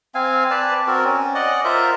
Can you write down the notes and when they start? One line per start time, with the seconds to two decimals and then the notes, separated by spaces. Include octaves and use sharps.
0.15 C4 F5 G#5
0.51 B4 D5 A5
0.87 C4 F#4 A#4
1.05 C#4
1.35 D5 D#5 F#5
1.65 F4 A#4 C5 E5